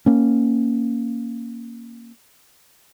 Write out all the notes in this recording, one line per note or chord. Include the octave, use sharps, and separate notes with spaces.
A#3 C#4